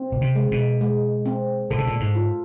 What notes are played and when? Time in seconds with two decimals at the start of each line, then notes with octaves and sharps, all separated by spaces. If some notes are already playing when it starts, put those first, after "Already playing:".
Already playing: C4
0.12 B2
0.21 C3
0.36 G#3
0.52 B2
0.81 G#3
1.26 C4
1.70 A#2 A4
1.78 B2
1.87 A#2
2.00 G#2
2.15 F4